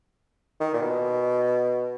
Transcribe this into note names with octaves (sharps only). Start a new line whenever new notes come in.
D#3
A#2
B2